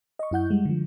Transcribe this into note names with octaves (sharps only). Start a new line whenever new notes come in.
D#5 C#6
F#2 E4 F#5 G6
G3 G#3
D3 F3